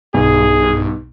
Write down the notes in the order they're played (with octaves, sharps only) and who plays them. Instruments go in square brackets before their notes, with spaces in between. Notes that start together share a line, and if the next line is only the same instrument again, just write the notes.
[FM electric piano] B1 B2 [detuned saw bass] G2 [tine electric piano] B3 D#4 [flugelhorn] G#4